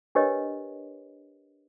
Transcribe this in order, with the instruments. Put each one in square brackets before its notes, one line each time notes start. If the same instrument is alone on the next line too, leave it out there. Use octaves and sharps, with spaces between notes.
[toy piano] D4 G4 A#4 B4 C#5 D#5